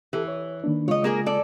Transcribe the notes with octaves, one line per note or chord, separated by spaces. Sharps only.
E3 G4 A4
C#5
D#3 A#3 D4
C#3 G#3 F4 C#5 D#5
A#3 G#4 A#4
A4 D5